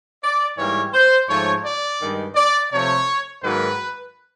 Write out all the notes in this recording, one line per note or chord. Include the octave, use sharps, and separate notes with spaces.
D5
G#2 E3 G3 A#3 C#5
C5
G#2 F3 A3 C#5
D5
G2 D#3 G#3
D5
C3 F3 A3 C#5
G#2 D#3 F#3 A#3 B4